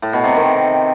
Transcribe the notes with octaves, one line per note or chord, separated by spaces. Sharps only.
A2
B2
C3
D#3